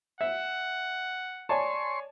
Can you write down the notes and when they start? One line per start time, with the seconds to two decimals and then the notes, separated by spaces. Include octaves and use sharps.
0.21 E5 F#5
1.49 C#5 D5 G#5 A5 C6 C#6